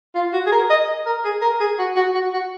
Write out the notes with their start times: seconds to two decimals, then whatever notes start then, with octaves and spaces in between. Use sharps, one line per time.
0.15 F4
0.33 F#4
0.46 G#4
0.52 A#4
0.70 D#5
1.06 A#4
1.25 G#4
1.42 A#4
1.60 G#4
1.79 F#4
1.96 F#4
2.14 F#4
2.33 F#4